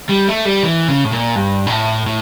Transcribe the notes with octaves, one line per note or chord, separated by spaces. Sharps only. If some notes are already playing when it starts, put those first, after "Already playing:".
G3
A3
G3
E3
C#3
A2
A#2
G2
A#2
A2
A2